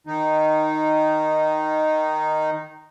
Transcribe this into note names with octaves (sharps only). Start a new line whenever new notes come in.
D#3 D#4